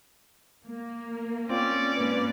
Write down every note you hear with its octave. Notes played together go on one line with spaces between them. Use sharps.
A#3
C4 C#4 F4 D5
G#2 A#3 B4